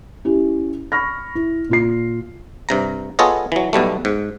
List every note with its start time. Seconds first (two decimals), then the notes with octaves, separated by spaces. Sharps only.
0.25 C#4 E4 G4
0.92 B5 C#6 F6 A#6
1.35 E4
1.69 A#2 F4 C7
2.69 G2 C3 A#5
3.19 B3 F4 G#4 A4 C#5 D#5
3.52 E3 F#3
3.73 B1 B2 G3 A3
4.05 G#2